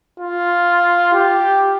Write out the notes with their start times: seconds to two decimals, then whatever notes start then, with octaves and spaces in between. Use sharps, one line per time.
0.20 F4
1.13 G4